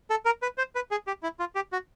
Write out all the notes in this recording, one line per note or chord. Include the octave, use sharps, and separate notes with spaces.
A4
A#4
B4
C5
B4
G#4
G4
E4
F4
G4
F#4